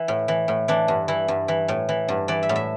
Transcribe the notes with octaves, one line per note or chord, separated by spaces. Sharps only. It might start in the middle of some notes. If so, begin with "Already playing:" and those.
Already playing: E3
A2
E3
A2
E3 D4
G2
E3 E4
G2
E3
A2
E3
G2
E3 D5
E5
A2
E5